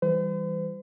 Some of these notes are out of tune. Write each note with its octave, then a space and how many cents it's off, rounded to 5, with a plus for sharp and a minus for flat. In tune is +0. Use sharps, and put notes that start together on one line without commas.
E3 -10 G3 +0 C5 -45